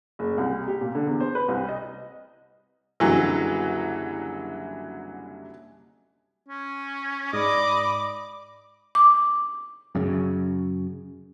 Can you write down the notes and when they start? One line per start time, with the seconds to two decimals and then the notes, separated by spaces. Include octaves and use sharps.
0.19 F#1
0.38 C2
0.67 G4
0.81 A#2
0.95 D3
1.07 E2
1.20 C5
1.35 B4
1.48 C2
1.69 D#5
3.00 F#1 C2 D3 E3 F#3
6.48 C#4
7.33 G#2 D5 D#5 B5 D6
8.95 D6
9.95 F#2 C#3